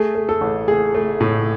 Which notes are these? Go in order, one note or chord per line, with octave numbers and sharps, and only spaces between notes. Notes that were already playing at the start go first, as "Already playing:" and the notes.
Already playing: A3 G#4
A3
A4
A1
A3 G#4
A3
A2